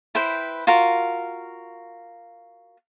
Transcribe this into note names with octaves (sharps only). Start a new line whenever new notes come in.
E4 B4 C5 G5
F4 F#4 A#4